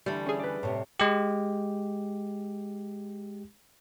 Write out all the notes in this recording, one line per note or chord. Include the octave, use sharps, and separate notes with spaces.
D3 E3 G3 A3
C#4 G#4
B4 D5
A2 C3
G#3 G4